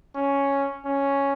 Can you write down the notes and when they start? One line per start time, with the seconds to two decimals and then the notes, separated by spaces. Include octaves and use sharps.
0.15 C#4
0.85 C#4